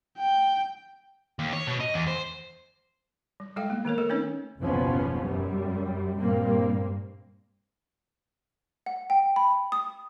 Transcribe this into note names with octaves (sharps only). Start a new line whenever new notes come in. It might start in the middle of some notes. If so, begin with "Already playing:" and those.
G5
D#2
C#5
B2
D#5
E2
C5
G3
G3 G#3 A4 F5 G5
A#3 B3
D#3 A#3 A#4 C#5
A3 A4 A#4
A3 C4 C#4 D#4 B4 C#5
F#1 D#2 B2 F3 B3 C#4
F#2 G3
G2 A#2 G3 A#3 C4
F#5
G5
B5
D#6